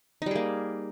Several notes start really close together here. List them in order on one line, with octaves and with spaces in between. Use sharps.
D#4 G3 G#4 A#3